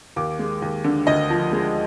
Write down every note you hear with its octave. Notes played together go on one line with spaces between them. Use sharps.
D#2 D6
G#3
D#2
D3
D2 D#5
F3
G#3